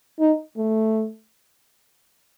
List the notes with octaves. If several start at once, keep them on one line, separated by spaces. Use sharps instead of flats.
D#4
A3